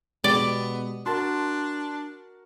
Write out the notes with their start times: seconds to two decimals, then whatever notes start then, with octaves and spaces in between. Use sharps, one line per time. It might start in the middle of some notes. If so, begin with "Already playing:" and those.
0.24 B2 G#3 B3 G4 D5
1.06 D4 F#4 A#4 A5 C6